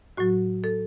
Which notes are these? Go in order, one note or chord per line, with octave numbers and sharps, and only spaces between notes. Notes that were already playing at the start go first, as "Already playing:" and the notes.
A2 F#3 F#4
A4